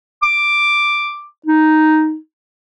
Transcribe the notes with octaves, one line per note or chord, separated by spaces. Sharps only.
D6
D#4